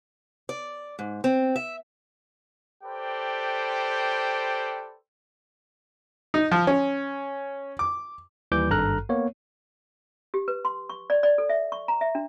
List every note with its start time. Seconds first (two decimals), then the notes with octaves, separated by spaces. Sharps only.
0.49 D5
0.99 G#2
1.24 C4
1.56 E5
2.84 G4 A4 B4 C5 D5 G5
6.34 D#4
6.52 F3
6.67 C#4
7.79 D6
8.52 D#2 E3 G3 D6 G6
8.70 G#1 G2 A4 A#5 F6 F#6
9.09 A#3 B3 C#5
10.34 G4
10.48 B4
10.65 C6
10.90 C#6
11.10 D5
11.23 D5
11.38 A4
11.49 E5
11.72 C#6
11.88 A#5
12.01 E5
12.15 D4